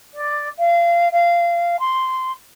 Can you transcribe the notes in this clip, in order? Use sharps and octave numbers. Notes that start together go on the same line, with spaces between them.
D5
F5
F5
C6